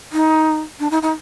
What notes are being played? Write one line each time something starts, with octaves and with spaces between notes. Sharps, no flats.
D#4
D4
D#4
D#4